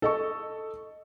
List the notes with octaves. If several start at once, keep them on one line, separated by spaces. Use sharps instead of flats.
A4 D#5 C#6